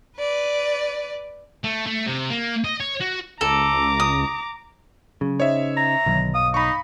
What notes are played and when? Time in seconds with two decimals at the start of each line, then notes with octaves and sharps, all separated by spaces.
0.19 B4 D5
1.64 A3
1.86 A3
2.06 C3
2.30 A#3
2.64 D#5
2.80 C#5
3.00 F#4
3.41 C#2 A4 A#5 D6
4.00 D#6
5.21 C#3 F#3
5.40 D#4 C5 C#5 D#5 E5
5.77 A#5
6.06 B1 D3 D#3 F#3
6.34 G2 F5 D#6
6.54 D#4 B5 C#6